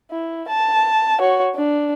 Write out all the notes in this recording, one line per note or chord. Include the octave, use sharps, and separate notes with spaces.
E4
A5
F#4 C#5
D4